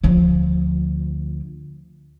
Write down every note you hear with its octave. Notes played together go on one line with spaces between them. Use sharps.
D2 F3